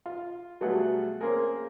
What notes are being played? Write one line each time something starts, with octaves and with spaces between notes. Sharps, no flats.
F4
B2 F#3 G3 A3 G#4 F#5
A#3 C4 C#4 G#4 A#4